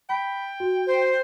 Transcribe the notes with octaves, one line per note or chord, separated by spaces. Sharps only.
G5 B5 B6
F#4
C5